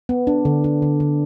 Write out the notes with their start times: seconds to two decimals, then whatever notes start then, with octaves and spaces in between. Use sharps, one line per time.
0.09 B3
0.27 D4
0.45 D3
0.64 D4
0.82 D3
1.00 D3